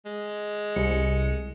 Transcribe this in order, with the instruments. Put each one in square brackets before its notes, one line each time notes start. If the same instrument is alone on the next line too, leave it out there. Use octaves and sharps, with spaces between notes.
[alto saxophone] G#3
[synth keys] C2 C#7